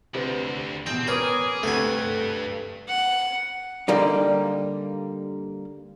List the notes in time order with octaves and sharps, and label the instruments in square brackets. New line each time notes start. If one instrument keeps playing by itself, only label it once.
[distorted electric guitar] D2 [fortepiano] C3 C4 B4
[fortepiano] E2 B2 [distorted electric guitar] C4 [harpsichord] G5
[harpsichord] C#4 A#4 [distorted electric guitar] G#4 [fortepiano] B4 [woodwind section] D6 D#6
[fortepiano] D2 C3 [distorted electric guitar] G2 [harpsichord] A3 G#5 [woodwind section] A4 B4
[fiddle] F#5
[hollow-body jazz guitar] D3 G3 A#3 D#4